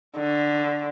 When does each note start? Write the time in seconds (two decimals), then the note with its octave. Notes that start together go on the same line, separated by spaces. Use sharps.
0.17 D3